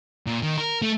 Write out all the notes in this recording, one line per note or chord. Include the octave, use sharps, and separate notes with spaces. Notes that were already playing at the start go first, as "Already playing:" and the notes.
A#2
D#3
A#4
A3